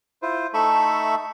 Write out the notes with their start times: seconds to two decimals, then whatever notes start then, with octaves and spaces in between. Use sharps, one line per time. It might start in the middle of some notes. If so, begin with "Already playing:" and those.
0.22 E4 F4 C5
0.54 A3 D#4 A4 E5 B5 C#6